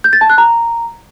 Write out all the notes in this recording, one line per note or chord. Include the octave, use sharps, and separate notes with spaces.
G6
A6
A5
F#6
A#5